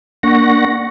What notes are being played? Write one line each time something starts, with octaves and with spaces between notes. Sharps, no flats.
A#3 D4 F#5 C#6 A#6